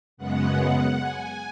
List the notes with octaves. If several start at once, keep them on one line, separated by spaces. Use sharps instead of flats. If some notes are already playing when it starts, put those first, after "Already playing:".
F#2 C#3 G#3 B3 F#5
G#5